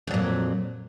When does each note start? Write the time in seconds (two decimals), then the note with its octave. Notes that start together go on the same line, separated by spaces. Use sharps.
0.07 F2
0.11 F#3
0.14 A#2